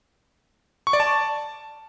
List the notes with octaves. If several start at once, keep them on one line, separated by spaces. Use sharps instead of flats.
C#6
D5
A5